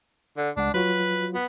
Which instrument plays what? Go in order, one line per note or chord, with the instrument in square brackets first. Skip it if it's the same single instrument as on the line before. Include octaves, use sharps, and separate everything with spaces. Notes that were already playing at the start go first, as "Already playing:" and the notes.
[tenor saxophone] D3
[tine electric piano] C#2 G#3 F#5 [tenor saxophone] D4
[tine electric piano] F#3 F4 F#4 [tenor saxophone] B4
[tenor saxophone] B3